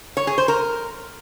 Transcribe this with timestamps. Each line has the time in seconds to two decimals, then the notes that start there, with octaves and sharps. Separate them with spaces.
0.17 C#5
0.27 G#4
0.38 C5
0.48 A#4